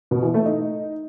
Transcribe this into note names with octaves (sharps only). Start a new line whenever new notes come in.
B2
E3
A3
D#4